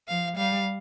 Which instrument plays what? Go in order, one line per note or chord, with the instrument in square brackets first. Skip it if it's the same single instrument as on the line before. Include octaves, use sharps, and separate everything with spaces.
[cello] F3 [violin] F5
[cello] G3 [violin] F5